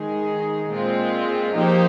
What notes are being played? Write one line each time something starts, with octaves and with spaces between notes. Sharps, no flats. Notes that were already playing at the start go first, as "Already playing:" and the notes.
Already playing: D#3 G#3 D#4 G#4
A#2 G#3 C4 F4
F3 A#3 D#4 G4 C5